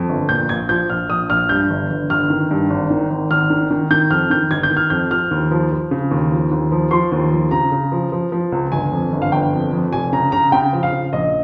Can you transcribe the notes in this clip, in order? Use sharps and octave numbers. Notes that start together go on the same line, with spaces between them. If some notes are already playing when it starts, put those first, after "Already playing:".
Already playing: F2
G1
A#2 G6
A#1 G#6
F3 G6
A#1 F6
A#1 D#6
A#1 F6
G2 G6
G1
G1
G1 F6
D#3
G2
G#1
D#3
G#1
G#1 F6
D#3
D#3
D#3 G6
F2 F6
D#3 G6
G1 G#6
G6
D#3
F6
F2 G6
F3 F6
D#2
F3
F3
C#3
D#2
F3
D#2
F3
F3 C6
D#2
F3
C#3 A#5
C#3
F3
F3
F3
C#2
G1 G#5
F2
G1
F5
G1 G5
F2
F2
F1 G#5
C#3 A#5
C#3 A#5
C#3 G5
F3
F5
C#3
A#1 D#5